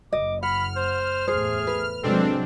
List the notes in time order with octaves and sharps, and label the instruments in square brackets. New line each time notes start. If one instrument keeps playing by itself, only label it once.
[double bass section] F#1 [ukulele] D#5 [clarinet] D6
[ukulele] F#5 [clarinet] B5 [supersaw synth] F6
[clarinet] C5
[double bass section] E2 A2 A3 [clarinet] G#4 [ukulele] C5
[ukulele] B4 [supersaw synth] F6
[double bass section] C3 F#3 G#3 [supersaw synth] C4 D4 [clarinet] A4